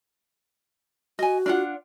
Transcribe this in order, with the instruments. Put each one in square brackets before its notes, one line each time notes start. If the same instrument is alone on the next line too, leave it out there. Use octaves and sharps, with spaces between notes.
[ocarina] F#4 [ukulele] D#5 G#5
[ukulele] D4 F4 F#5